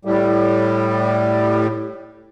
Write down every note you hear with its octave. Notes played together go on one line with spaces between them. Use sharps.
A2 G3